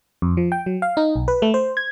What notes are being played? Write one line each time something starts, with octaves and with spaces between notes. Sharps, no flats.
F2
F3
G5
F#3
F5
D#4
B1
B4
A3
C5
G#6